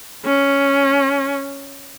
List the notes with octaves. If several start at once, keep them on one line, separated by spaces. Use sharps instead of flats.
C#4